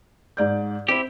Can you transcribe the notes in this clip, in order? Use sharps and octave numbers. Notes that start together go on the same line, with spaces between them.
G#2 D5 G6
C4 E4 G4